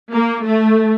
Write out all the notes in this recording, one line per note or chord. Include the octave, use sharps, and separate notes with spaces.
A#3
A3